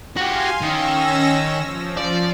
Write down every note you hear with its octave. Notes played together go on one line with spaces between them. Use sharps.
F#4 G4 F5 G#5 C6
D#3 C#4 E6 A#6
F3
D5